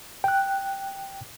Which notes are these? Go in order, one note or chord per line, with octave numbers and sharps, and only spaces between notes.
G5 F#6